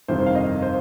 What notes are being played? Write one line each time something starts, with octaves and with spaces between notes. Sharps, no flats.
G1 F2 C3 D#3 C5
F5
D#5
C5